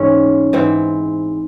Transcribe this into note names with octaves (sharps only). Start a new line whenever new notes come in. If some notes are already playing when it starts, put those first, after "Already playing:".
Already playing: G#2 E3 C4 C#4
G#2 E3 C4